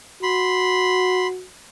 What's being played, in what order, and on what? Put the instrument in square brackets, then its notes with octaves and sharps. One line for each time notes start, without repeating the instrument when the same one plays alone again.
[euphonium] F#4 [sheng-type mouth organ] B5 C6